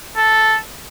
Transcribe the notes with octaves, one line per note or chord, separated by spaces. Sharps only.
A4